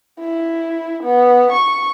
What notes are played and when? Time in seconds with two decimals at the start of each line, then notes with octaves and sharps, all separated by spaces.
0.20 E4
1.03 B3
1.52 C#6